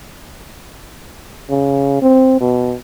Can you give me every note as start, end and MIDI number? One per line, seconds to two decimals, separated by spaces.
1.50 2.01 49
2.02 2.39 60
2.40 2.75 47